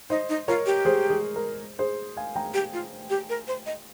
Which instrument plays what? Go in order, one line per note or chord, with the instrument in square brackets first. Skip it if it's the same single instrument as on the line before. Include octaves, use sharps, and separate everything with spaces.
[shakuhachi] D#4 [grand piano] C5 D#5
[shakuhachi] D#4
[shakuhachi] F4 [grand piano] A#4 C#5
[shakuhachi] G4
[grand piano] G#4 C5
G#4
A#4
G#4 C5
F5 G#5
G5 A#5
[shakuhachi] G4
F4
G4
A#4
C5
D#5